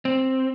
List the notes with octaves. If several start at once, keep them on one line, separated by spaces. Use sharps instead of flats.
C4